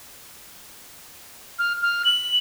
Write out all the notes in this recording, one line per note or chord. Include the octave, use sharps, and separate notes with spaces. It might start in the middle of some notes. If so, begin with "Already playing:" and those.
F6
F6
F#7